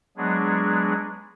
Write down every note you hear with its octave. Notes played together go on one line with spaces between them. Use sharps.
F#3 G#3 B3 D4 G#4